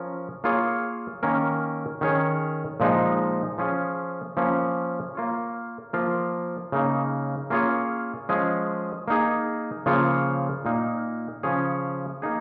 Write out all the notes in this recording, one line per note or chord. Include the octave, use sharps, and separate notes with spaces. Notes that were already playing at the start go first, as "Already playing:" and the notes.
Already playing: F3 C#4 A#4
A#3 F4 G#4 C#5
D#3 A#3 C#4 A#4
D#3 C#4 G#4 C#5
A#2 F3 G#3 D#4
F3 C#4 F4 G#4
F3 A#3 C#4
A#3 F4 C#5
F3 A#3 F4 A#4
C#3 A#3 D#4
A#3 C#4 F4 G#4 C#5
F3 G#3 C#4 G#4
A#3 D#4 G#4
C#3 F3 A#3 F4 C#5
A#2 A#3 D#4
C#3 F3 C#4 G#4 C#5
A#3 D#4 G#4